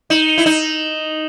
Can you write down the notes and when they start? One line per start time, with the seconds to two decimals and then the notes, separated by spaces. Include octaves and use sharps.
0.10 D#4 E7 F#7
0.28 F7 G7
0.38 E4
0.45 D#4 E7 F#7